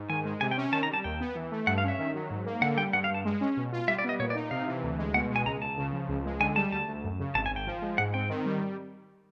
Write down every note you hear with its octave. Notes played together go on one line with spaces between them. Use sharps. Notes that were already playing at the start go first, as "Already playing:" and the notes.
Already playing: G#2
D#3 G#5
G#3
C3 G#5
G5
C#4
D#3 A5
A#5
G3 A5
D#2 G5
B3
E3
A3
G2 F#5
F5
C#4 E5
D#3
F#3
G#2
A#3
D3 F#5
G3 G5
G2 F#5
F5
G2 A5
G#3
C#4
B2
F4
G3 E5
D5
B3 D#5
A#2 C#5
D5
D#4
C3 F5
E3
D2
G#3
B2 F#5
G#3
G#5
C#2 A#5
C#2 A5
C#3
F3
C#2
G#3
D3 G#5
G3 A5
D2 A5
D2
F#2
C#3
G#1 A5
G#5
G#1
G5
F3
G#3
G#2 F#5
C4 G5
D#3
G3